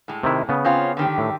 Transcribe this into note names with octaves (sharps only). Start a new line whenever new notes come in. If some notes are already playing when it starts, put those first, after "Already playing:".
A2 G#3
C3 D#3 E4
C#3 B3
C4 C#4 F4
D3 D#3 G4
A2